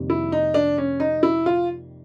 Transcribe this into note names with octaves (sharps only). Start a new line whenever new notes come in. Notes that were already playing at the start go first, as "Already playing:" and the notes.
Already playing: F2 C3 D#3 G3 A#3
E4
D#4
D4
C#4
D#4
E4
F4